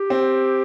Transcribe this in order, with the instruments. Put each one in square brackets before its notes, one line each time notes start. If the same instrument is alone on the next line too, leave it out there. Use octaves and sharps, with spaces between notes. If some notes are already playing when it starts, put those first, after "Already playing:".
Already playing: [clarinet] G4
[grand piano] C4